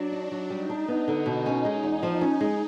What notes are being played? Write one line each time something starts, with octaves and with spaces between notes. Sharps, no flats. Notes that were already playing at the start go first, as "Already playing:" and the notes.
Already playing: F#3 D4
D#4
F#3
G3 D#4
D4
B3
D3
B2
C#4
G#3 D#4
E2
F3
C#4
G#3